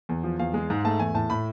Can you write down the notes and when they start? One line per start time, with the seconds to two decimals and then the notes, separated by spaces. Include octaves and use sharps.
0.09 E2
0.24 F3
0.39 E2 F5
0.54 G#3
0.70 G#2
0.85 A3 A5
0.99 E2 G#5
1.14 A2 A5
1.30 A2 B5